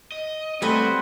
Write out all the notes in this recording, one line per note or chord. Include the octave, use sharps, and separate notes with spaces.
D#5
G3 A3 C4 F#4 B4 D#5 G#5